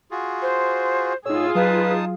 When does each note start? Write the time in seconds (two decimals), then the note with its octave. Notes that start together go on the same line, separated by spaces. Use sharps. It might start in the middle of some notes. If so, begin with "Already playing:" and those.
0.11 F4 F#4 G#4
0.42 C5
1.26 A2 D#4 F4 G#4 C#5 E6
1.55 F#3 D#4 B4 F5 A5 D#6